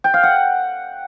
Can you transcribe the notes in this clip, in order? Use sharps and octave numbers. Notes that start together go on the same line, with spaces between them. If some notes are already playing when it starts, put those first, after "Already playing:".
G5
F5
F#5